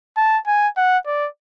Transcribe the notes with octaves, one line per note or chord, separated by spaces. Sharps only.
A5
G#5
F#5
D5